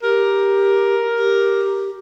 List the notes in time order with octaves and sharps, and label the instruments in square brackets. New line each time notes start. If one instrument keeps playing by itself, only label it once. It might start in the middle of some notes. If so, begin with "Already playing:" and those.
[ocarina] G4 [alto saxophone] A#4
[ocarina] G4